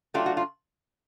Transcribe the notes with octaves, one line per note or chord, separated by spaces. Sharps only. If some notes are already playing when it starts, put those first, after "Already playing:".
F#3 A3 D4 F4 G4
F#4
F4